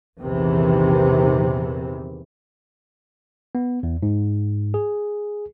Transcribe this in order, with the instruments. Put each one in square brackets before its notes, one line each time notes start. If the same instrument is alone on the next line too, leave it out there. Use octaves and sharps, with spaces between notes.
[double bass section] A#1 E2 C3 D#3 E3
[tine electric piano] B3
E2
G#2
G#4